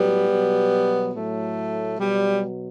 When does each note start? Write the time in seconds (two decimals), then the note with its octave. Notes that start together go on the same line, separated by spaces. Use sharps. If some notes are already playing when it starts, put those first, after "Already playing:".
Already playing: A2 F#3 G3 B3
0.30 B2 F#3
1.14 A2 F#3 A3
1.99 B2 F#3 G3